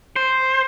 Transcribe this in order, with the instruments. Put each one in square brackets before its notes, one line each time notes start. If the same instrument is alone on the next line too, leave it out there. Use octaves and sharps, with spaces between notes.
[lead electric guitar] C5